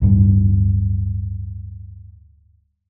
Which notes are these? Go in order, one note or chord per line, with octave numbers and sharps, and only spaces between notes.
D1 G2